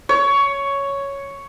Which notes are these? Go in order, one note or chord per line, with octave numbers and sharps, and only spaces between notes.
C#5